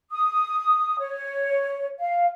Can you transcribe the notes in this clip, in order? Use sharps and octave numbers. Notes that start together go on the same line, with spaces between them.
D#6
C#5
F5